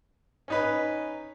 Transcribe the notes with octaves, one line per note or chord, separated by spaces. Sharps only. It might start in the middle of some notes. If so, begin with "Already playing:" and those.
C#4 D#4 B4